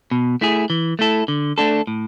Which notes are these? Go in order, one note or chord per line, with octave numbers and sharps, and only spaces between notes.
B2
A3 E4 G#4
E3
A3 E4 A4
D3
A3 D4 A4
A2